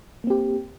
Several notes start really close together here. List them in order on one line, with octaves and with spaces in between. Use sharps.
A#3 C4 G4